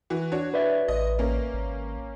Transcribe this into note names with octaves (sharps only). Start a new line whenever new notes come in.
E3 F#4
D4 F#4 C#5
B4 D5 E5
A1 D#5
A#3 C#4 A#4
G#1